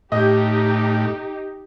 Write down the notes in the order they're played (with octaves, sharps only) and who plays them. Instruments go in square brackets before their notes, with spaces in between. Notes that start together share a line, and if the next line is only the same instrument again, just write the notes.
[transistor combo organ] A2 [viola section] D#4 G4 [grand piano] D#5 G6